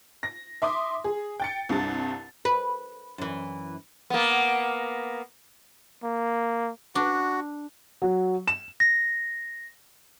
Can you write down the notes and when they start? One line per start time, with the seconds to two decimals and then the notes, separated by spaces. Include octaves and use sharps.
0.23 A#6
0.62 E5 C6 D6 D#6
1.04 G#4
1.40 G5 A6 C#7
1.69 C2 G2 C3 A6
2.45 B4
3.18 F#2 E3
4.10 A#3 B3
6.03 A#3
6.95 D4 F#4
8.02 F#3
8.48 E7
8.80 A#6